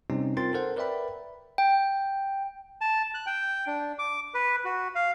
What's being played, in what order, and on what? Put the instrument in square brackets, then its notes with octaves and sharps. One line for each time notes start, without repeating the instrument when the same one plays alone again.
[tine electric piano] C3 G3 C4 C#4 D#4
C4 F4 A#4 G5 C6 A6
A4 A#4 C5 F#5
A#4 B4 D5 E5 G5 B5
[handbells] G5
[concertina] A5
F#6
G5
D4
D6
B4
F#4
F5